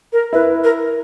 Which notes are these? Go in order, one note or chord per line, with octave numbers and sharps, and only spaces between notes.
A#4
E4 B4
A#4